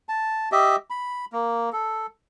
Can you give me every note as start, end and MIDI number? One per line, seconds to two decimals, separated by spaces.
0.09 0.49 81
0.52 0.76 67
0.52 0.76 75
0.52 0.76 76
0.90 1.25 83
1.33 1.69 58
1.73 2.06 69